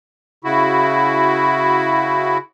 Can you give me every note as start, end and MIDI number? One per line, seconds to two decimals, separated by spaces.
0.44 2.38 49
0.44 2.38 64
0.44 2.38 66